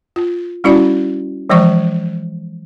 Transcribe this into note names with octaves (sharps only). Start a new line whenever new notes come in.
F4
G3 C#4 E4 F#4 D5
E3 F3 G#3 C5 D5 C#6